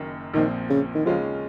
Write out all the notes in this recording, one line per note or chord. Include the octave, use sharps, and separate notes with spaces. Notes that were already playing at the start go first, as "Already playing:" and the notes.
Already playing: F#1 F#2 D#3 A#3
A#1 A#2 D#3 F3 C4
C#3
D#3
D#2 C#3 F3 G#3 C#4 F4